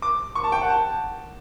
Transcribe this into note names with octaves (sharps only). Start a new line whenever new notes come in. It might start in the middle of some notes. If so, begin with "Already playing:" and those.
D6
C#6
A5
G5
F#5
A5